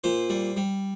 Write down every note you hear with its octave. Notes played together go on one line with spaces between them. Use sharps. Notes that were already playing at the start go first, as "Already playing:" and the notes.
A#2 C5
G3
G3